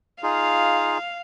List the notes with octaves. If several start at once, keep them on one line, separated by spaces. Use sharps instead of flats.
D#4 F4 G#4 F5